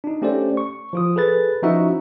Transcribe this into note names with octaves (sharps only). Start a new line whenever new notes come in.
D4 D#4
A3 C#4 G4 A4 C5 D5
C#6
F3 F4 D#6
G#4 A4 B4 A6
F3 C#4 D#4 E4 F#4 E5